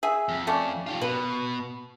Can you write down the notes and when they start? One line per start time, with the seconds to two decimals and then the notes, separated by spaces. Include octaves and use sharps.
0.03 G#4 E5
0.28 F2
0.47 A3 C#4 D5
0.87 F4 G4
1.01 B2 B4